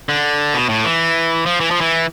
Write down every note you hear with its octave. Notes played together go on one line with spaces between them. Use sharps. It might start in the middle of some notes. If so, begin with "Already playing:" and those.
D3
B2
A2
E3
F3
E3
F3
E3